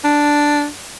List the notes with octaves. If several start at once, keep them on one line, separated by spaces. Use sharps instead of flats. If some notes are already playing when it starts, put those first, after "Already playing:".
D4